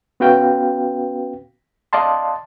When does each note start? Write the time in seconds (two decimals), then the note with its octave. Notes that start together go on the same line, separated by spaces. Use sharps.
0.20 B3 C#4 F#4 B4 F5 G5
1.93 D5 D#5 F5 A5 C6